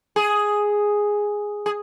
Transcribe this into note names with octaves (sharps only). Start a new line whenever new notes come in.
G#4
G#4